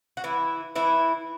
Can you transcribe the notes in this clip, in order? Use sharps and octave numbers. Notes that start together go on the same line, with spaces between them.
F#4
E3 E4
E3 E4